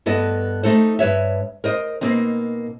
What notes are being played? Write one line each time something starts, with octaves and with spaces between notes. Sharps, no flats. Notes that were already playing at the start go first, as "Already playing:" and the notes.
G2 B3 A4 D#5
A3 D#4 A4 C5
G2 B4 C#5 E5
A#4 C5 D#5
B2 A#3 C4 D#4